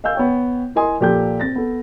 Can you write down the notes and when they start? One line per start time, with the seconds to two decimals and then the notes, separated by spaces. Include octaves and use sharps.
0.04 D#5 F5 G#5 E6 G6
0.15 B3 C#5 G5
0.75 E4 A#4 D#5 G#5 C6 D#6
1.00 A#2 F3 G4 A4 G6
1.40 C4 A6 A#6
1.56 B3 A4